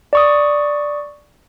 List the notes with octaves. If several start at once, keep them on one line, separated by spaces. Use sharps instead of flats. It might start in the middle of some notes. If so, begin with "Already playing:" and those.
D5 C#6 D#6